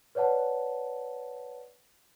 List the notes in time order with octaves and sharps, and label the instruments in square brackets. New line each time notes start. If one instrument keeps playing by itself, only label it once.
[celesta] B4 C#5 D5 F#5 A5